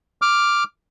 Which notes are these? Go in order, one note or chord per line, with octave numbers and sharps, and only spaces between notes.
D6 F6